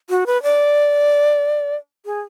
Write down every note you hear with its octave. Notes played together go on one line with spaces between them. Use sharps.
F#4
B4
D5
G#4